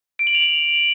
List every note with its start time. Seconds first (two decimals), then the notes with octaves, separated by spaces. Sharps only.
0.19 D7
0.27 F#7
0.35 F7
0.42 F#7